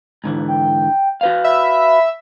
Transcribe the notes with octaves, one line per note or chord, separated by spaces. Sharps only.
G#2 D3 E3
G5
F#4 B4 F5
E5 B5